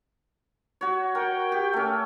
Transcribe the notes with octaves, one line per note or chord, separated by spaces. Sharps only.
F#4 C#5
A#4 G5
G4
A3 C#4